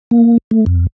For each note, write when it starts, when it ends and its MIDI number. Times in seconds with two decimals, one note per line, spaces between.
0.11 0.38 58
0.51 0.65 57
0.66 0.87 41